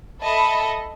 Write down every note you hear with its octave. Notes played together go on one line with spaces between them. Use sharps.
A4 D#5 E5 A5 B5